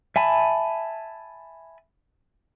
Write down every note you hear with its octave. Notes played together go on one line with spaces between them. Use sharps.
E5 G#5 A5 B5